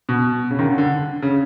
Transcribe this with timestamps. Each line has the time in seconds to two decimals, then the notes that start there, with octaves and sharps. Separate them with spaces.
0.09 B2
0.51 C#3
0.59 D#3
0.64 D3
0.78 D3
1.22 C#3